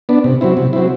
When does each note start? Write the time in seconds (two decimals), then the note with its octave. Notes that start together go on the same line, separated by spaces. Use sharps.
0.09 B3 D4
0.24 C3
0.41 F#3 C4 E4
0.57 C3
0.73 F#3 C4 E4